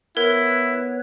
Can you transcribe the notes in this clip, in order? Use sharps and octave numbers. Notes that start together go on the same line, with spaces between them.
B3 E4 A#4 B4 C#5